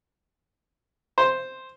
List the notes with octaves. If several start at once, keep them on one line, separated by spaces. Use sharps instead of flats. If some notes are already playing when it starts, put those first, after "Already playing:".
C5